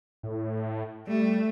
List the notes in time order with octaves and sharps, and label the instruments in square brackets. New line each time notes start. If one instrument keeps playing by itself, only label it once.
[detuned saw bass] A2
[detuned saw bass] G3 [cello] A3